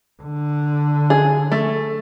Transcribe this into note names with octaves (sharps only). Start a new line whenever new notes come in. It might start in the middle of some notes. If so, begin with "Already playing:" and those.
D3
G#4
A3